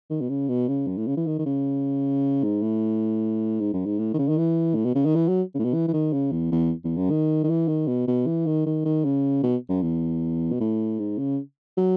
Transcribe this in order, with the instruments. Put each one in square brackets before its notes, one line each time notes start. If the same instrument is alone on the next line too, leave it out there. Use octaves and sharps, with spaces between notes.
[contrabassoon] D#3
B2
C#3
B2
C#3
F#2
A2
C#3
E3
D#3
D#3
C#3
G#2
A2
G#2
F#2
G#2
A2
D#3
C#3
D#3
E3
A2
B2
C#3
D#3
E3
F#3
C#3
A2
B2
E3
E3
D#3
C#3
E2
E2
E2
F#2
D#3
D#3
E3
D#3
B2
B2
E3
D#3
D#3
D#3
C#3
B2
F#2
E2
B2
A2
G#2
C#3
F#3